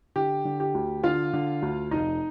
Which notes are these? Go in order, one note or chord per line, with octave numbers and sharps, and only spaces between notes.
D3 G4
D3
G4
D2
D3 F4 F5
D3
D2
F1 D#4 D#5